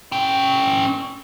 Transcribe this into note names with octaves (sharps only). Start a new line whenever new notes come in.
C#4 G5